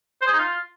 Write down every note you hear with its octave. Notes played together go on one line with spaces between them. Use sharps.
C5
G#4
D#4
F4